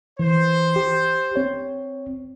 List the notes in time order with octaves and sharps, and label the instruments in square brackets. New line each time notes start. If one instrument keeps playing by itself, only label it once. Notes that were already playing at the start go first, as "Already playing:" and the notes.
[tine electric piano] E3 [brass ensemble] C5
[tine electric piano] G4
C4 C#5